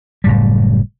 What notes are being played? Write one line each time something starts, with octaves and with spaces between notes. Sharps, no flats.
F#1 A2 G3